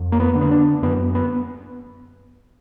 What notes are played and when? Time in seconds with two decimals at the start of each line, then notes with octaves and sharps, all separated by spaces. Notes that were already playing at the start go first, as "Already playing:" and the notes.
Already playing: F2
0.12 A#3
0.20 B3
0.35 D3
0.41 B3
0.51 D4
0.82 F#2 B3
1.15 B3